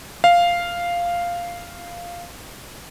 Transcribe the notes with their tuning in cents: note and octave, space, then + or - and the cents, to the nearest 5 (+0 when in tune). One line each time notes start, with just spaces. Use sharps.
F5 -5